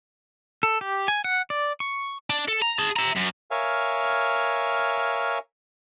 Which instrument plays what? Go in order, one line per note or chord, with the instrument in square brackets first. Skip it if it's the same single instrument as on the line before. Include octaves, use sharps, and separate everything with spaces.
[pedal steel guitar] A4
G4
G#5
F#5
D5
C#6
[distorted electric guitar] D4
A4
A#5
G#4 A5
E5 A#5
F#2
[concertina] A#4 C#5 E5 F5 G#5